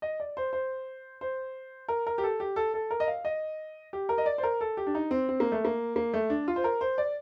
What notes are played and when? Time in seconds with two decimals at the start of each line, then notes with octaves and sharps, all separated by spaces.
0.02 D#5
0.20 D5
0.37 C5
0.53 C5
1.21 C5
1.88 A#4
2.07 A#4
2.18 G4
2.24 A4
2.40 G4
2.56 A4
2.74 A4
2.91 A#4
3.00 D#5
3.08 F5
3.25 D#5
3.93 G4
4.09 A#4
4.18 D#5
4.26 D5
4.38 C5
4.43 A#4
4.61 A4
4.77 G4
4.87 D4
4.95 D#4
5.11 C4
5.29 C4
5.40 A#3
5.52 A3
5.65 A#3
5.96 A#3
6.14 A3
6.30 D4
6.48 F4
6.56 C5
6.64 A#4
6.81 C5
6.98 D5